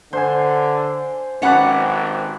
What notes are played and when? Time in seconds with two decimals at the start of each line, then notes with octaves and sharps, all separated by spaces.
0.13 D3 C5 G#5
1.42 G#1 F#3 C#4 G4 B4 D5 F#5